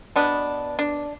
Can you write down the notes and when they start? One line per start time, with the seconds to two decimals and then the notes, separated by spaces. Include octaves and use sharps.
0.16 B2 B3 D4
0.79 D4